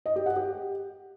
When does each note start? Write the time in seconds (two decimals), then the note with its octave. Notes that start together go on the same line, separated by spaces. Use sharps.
0.06 D#5
0.16 G4
0.26 F#5
0.36 G4